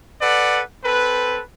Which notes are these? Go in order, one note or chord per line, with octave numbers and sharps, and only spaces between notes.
A4 B4 D5 F#5
C4 A4 B4